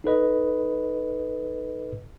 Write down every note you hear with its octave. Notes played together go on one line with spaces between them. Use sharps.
D#4 A4 B4 D#5